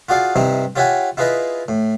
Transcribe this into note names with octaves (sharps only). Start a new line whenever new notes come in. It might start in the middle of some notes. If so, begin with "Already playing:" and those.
F4 F#4 G#4 D5 F5
G2 C3 C4 D#4 E4
F4 G4 C#5 E5 F#5 G#5
E4 F4 G#4 B4 D#5
A2